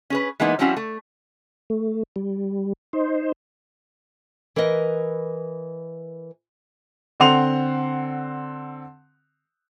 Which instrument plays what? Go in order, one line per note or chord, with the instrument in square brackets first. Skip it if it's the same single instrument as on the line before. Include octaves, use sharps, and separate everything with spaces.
[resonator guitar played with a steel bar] C#4 G#4 B4
E3 G#3 A#3 B3 D#4
F3 G3 C4 C#4 E4 F#4
A3
[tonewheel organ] A3
G3
D#4 C5
[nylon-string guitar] E3 A#4 B4 D#5
[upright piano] D3 C4 F#5 C6 F7